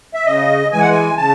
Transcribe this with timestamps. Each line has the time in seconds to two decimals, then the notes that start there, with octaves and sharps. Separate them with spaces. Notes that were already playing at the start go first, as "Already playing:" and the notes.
0.14 E5
0.25 C#3 D#5
0.72 E3 G#3 G#5
0.81 F#5
0.90 G#5
1.17 C#3 A5